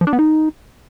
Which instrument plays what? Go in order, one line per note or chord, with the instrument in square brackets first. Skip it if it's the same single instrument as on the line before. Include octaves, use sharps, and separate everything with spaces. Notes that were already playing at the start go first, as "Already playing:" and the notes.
[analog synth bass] F3
D4
B3
D#4